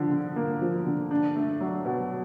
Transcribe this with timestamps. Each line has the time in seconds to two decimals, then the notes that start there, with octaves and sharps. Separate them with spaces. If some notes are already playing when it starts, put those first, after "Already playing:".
Already playing: D3 F3
0.11 D3
0.36 A#3
0.61 F3
0.86 D3
1.11 D4
1.36 A3
1.61 F#3
1.85 B2